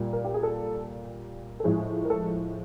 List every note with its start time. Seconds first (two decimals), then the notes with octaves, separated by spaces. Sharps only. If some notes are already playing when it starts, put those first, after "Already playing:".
Already playing: A#2 G3
0.13 A#4
0.25 G4
0.34 G#4
0.43 A4
1.60 A4
1.64 A2 F3 G#3 G#4
2.05 A#4
2.10 A4